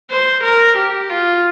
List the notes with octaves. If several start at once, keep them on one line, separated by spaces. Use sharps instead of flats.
C5
A#4
G4
F4